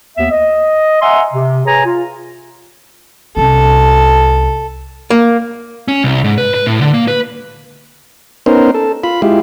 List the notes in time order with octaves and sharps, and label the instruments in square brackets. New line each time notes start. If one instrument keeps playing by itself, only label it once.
[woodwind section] D#2 B3 E5
D#5
E5 F#5 G#5 A#5 C6
C3
G#4 B4 C#5 G#5 A#5
F4
[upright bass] C2 C#4 [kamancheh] A4
[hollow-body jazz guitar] A#3
[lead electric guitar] C#4
C2
G#2
B4
B4
A2
D3
A#3
B4
[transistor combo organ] B3 C#4 D#4 A#4 C5
A4
F4 B5
G#3 E4 F4 G4